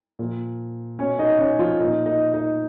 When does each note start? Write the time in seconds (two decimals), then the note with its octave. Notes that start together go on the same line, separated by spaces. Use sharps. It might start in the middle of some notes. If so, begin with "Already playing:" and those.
0.19 A#2 F3
0.99 B2 C#4 C#5
1.19 D#4 D#5
1.39 C#4 C#5
1.59 F3 F4
1.80 A#2 F3 D#4
2.06 D#4
2.34 D#4